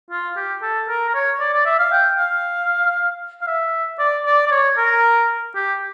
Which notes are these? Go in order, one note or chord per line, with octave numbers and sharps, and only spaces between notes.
F4
G4
A4
A#4
A#4
C#5
D5
D5
E5
F5
G5
F5
F5
E5
D5
D5
D5
C#5
A#4
G4